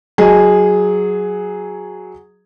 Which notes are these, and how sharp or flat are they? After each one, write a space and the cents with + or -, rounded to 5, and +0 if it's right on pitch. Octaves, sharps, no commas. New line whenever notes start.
F#3 +0 G#4 +0 D#5 +0